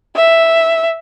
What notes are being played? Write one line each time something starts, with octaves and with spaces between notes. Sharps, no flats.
E5